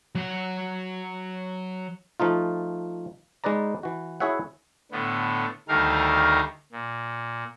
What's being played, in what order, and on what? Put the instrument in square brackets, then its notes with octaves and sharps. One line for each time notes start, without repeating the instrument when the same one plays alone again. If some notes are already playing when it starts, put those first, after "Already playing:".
[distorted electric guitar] F#3 F#5
[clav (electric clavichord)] F3 A3 D#4 F4
G#3 D#4 B4 D5 A#5
E3 F#4
E4 F#4 G#4 C#5 E5 F#5
[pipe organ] A2 D3 B3
D2 D#3 G3 A3 A#4 F5
A#2